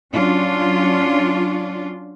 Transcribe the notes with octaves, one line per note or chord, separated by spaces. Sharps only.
F#3 C#4 D4 F4